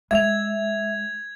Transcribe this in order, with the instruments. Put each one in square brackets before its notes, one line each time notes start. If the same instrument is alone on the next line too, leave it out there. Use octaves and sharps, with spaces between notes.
[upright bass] G#3 [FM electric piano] E5 [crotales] G#6 F7